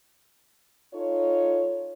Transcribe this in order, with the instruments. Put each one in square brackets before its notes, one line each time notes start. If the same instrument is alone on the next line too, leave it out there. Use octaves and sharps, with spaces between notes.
[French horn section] D#4 F4 A4 C#5